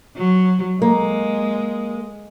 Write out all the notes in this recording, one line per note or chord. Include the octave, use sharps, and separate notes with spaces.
F#3
G#3 A#3